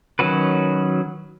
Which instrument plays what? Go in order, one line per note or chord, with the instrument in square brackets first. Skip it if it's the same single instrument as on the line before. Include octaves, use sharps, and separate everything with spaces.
[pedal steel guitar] D#3 F#3 C#4 F#4 B4